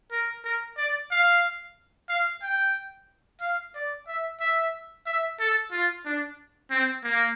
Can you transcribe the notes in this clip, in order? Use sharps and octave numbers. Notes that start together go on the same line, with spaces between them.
A#4
A#4
D5
F5
F5
G5
F5
D5
E5
E5
E5
A4
F4
D4
C4
A#3